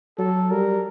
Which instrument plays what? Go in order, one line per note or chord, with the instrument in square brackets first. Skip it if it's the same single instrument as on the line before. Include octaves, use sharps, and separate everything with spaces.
[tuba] F#3 [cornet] A4
[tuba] G3 [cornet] A#4